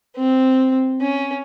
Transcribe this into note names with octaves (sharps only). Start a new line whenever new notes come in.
C4
C#4